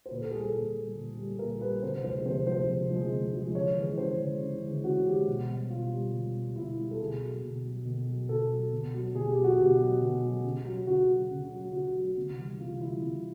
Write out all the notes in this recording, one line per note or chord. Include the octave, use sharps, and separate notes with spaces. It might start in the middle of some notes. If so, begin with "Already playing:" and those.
C5
A#2 B4
A4
G3 G#4
A4
A#2
G3
A#2
G3
A#2 A#4
G3 B4
C3 C5
F3 G#3 C5
C3 C5
F3 G#3 C5
C3
F3 G#3
C3
F3 G#3
C#3 C#5
E3 G#3
C#3 C5
E3 G#3
C#3
E3 G#3
C#3 F#4
E3 G#3 G4
B2
G3
B2 F4
G3
B2
G3
B2 E4
G3
A4
B2 G#4
F#3
B2
F#3
B2
F#3
B2 A4
F#3
B2
F#3
B2 G#4
G4
F#3
F#4
B2 G4
F#3
B2
F#3
C#3
F#3
C#3 F#4
F#3
C#3
F#3
C#3 F#4
F#3
C3
E3 G3
C3 F4
E3 G3 E4
C3